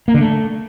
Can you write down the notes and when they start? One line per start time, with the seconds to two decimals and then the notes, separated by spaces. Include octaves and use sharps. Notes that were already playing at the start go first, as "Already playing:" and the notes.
0.08 A#3
0.14 D3
0.21 A3